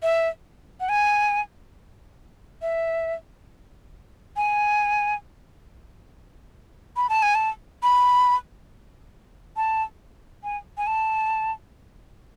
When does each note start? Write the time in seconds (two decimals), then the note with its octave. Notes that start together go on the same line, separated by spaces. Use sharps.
0.03 E5
0.80 F#5
0.89 G#5
2.62 E5
4.37 G#5
6.97 B5
7.09 A5
7.23 G#5
7.35 A5
7.83 B5
9.57 A5
10.44 G#5
10.78 G#5
10.87 A5